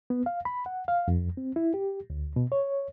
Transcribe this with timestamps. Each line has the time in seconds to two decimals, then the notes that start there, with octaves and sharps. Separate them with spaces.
0.10 B3
0.26 F5
0.45 B5
0.66 F#5
0.88 F5
1.08 F2
1.37 C4
1.56 E4
1.74 G4
2.10 D2
2.36 B2
2.52 C#5